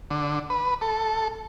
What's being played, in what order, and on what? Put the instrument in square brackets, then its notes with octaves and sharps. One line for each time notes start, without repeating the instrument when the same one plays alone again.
[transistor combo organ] D3
B4
A4